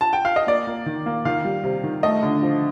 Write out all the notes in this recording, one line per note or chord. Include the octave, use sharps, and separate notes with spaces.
A5
G5
F5
D#5
A#3 D5
A#3
D#3
A#3
D#3 F5
G3
C3
D#3
A3 D#5
D3
F3